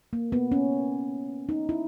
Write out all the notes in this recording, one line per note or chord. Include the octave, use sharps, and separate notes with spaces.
A#3
B3
C#4
D#4
E4